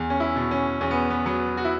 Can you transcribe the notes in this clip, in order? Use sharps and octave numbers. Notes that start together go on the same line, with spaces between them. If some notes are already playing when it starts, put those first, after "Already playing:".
Already playing: E2
C#4
E4
B2
C#4
E2 C#4
B3
B3
F#3 B3
F#4
E4